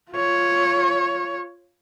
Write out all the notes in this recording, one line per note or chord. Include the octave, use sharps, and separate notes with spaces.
F4 C#5